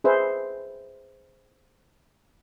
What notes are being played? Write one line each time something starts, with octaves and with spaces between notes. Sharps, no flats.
G#4 B4 C5 E5